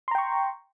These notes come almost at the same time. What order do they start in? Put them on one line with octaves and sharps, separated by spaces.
C6 A#5 G5 C#6